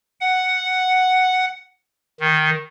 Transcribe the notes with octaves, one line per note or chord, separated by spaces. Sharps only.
F#5
D#3